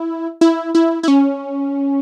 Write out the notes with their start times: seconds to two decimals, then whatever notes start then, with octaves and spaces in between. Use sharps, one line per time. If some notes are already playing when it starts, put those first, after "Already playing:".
Already playing: E4
0.41 E4
0.75 E4
1.03 E4
1.08 C#4